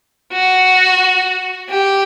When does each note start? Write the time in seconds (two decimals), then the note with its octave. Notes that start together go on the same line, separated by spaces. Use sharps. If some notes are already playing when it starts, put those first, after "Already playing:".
0.33 F#4
1.70 G4